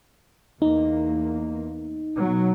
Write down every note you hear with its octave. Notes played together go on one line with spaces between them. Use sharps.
E2 A#3 D#4
B2 F#3